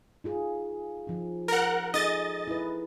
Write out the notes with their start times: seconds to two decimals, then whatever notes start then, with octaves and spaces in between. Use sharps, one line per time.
0.24 D#4 F4 G#4
1.07 F3 D#4
1.48 A#4 F#5
1.94 D#4 G#4 A4 D#5 A6
2.47 E4 B4